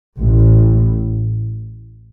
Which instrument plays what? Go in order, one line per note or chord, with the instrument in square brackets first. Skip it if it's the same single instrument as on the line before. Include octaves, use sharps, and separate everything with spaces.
[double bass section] A1 A2